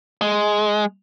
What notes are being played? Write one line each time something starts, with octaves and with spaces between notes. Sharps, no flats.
G#3